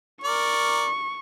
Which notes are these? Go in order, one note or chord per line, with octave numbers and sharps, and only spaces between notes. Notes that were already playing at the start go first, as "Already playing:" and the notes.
A#4 D5 C#6